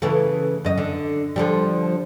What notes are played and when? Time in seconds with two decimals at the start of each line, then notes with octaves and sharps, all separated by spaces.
0.02 C#3 E3 A3
0.64 F#2 D#5
0.78 D3
1.36 D3 F3 G3